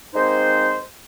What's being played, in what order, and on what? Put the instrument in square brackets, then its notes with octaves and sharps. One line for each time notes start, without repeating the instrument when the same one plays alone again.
[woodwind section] G#3 A#3 C4 D#4 C5